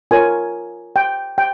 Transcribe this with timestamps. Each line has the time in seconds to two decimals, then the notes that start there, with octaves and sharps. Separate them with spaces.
0.11 F4 A#4 C#5 G#5
0.96 G5
1.38 G5